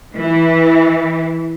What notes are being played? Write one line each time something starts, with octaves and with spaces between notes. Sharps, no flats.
E3